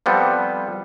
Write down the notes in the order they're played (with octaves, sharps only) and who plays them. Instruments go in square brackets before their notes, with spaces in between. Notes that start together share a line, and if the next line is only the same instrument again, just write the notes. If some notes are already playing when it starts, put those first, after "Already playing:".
[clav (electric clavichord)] F3 G3 B3 C4 A4